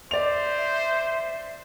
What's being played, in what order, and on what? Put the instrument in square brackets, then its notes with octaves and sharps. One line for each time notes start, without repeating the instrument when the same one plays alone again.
[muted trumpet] C5 [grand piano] D5 F7 [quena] E5